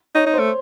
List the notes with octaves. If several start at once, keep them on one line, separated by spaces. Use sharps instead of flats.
D#4 C#5
D#4
C5
A3